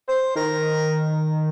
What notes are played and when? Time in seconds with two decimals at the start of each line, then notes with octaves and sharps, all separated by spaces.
0.09 C5
0.35 D#3 A#4